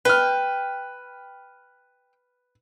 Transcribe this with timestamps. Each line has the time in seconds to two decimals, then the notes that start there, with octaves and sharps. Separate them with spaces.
0.05 B4 G5 F6